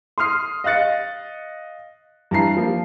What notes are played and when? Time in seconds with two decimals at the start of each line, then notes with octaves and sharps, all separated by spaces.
0.18 C6 D#6 F6 C7
0.64 D#5 F5 F#6 A6 C#7
2.31 G2 E3 A5 A#5 C7
2.57 F3 A#3